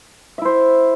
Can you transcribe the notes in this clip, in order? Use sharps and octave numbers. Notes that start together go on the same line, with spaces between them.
E4 C5 E5